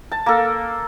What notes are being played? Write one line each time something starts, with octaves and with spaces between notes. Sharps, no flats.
A5
A#3 A4